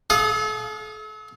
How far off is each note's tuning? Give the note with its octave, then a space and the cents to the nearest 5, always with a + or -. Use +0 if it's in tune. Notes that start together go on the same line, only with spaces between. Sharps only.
A4 -40 F5 +25 D#6 +0